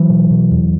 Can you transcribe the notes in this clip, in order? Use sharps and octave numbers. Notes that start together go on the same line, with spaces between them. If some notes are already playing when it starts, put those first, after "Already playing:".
Already playing: E3 F#3
B2
B2
E2